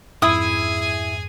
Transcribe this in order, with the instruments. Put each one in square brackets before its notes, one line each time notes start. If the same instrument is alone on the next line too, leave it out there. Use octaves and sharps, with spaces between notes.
[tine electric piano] F2 G#2 [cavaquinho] E4 E5 D#6 [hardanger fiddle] G#4 G#5